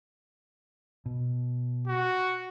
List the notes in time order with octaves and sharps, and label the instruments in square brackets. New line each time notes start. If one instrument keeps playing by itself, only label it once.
[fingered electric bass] B2
[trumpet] F#4